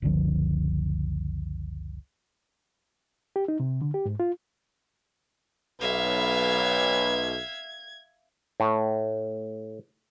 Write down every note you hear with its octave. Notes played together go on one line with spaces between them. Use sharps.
F#1 C#2 D3 F3
G4
D#4
C3
D3
G4
G#2
F4
B1 B4 E5 F5 G#6
A2